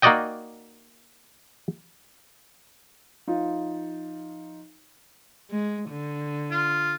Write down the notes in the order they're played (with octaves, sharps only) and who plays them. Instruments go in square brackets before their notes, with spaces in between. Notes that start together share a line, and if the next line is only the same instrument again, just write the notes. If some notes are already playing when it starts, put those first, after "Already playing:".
[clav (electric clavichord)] A#3 D#4 F#4 D5 D#5 G5
[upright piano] F3 D#4 F4
[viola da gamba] G#3
D3
[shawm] F4